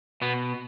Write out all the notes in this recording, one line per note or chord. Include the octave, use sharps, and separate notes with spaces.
B2 B3